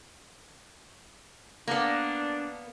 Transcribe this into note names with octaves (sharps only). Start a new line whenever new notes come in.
A#3 B3 D4